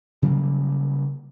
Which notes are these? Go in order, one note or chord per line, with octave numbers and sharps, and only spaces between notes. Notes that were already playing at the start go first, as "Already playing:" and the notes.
C#3 F#3 G3 A#3